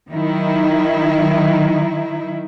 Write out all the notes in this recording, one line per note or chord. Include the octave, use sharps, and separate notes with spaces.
D#3 F#3 D#4 E4